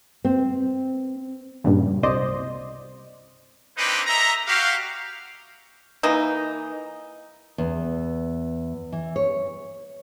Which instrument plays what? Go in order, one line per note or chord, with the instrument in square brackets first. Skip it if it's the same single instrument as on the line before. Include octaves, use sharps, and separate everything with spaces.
[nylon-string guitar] C4
[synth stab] G2 A#2 C#3
C2 C5 D5 D#5
[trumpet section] A#3 C4 D4 D#4 G4 B4
A4 D#5 E5 A#5
F#4 G4 F5
[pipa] E3 A#3 D#4
[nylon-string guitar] E2
E3
C#5